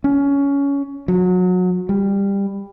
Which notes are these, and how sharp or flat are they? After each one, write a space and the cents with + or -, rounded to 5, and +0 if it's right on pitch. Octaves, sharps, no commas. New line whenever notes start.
C#4 +20
F#3 -25
G3 +20